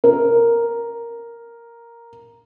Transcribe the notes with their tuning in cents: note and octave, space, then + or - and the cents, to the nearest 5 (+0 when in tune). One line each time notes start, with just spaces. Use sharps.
A#4 +0